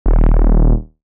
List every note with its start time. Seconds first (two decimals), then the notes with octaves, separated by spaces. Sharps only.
0.06 D#1